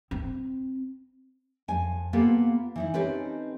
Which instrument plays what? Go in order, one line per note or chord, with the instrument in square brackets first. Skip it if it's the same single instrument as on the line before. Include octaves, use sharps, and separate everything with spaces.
[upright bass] C4
[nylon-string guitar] F2 G#5
A#3 B3 F4 G4 A4
E3 D#4 E4
C4 C#4 D#4 G4 A4 B4